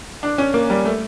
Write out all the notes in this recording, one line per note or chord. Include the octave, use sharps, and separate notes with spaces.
D4
C#4
A#3
G3
A3